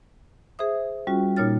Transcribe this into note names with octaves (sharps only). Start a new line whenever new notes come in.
G#4 C5 E5 D#6
G3 C#4 F4 F#4
A#2 A#3 D#4 C#5 F6 A6